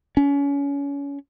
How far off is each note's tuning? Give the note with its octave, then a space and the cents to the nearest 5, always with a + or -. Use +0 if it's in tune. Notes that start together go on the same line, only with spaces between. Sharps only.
C#4 +30